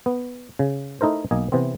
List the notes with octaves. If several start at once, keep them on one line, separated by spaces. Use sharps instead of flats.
B3
C#3
A3 D#4 E4 A#4 C5
B1 A#3 D#5 G#5
C3 E3 B3 C4